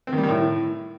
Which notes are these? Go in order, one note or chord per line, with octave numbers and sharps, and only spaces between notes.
C4
D#3
G3
D#3
A2